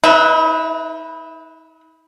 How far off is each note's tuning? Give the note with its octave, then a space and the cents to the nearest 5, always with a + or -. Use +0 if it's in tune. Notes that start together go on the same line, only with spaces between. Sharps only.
D#4 +45 B4 -5 E5 +0